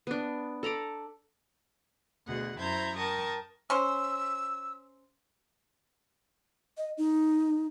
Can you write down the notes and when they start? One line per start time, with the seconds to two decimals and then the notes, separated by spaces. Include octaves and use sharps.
0.07 B3 D4
0.63 A4 A#5 B5 D6
2.27 D2 B2 G#4 F#5
2.59 F#2 E4 C5 A#5 G6 G#6
2.96 A#4 G5 A5 C#6 D#6
3.70 C#4 C5 E6
6.77 D#5
6.98 D#4